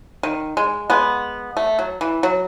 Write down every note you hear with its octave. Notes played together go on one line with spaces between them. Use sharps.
D#3
G#3
G#3 B3
A3
F#3
E3
F#3